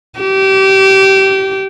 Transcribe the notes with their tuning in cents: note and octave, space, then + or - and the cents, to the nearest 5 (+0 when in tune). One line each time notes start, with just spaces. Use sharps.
G4 -25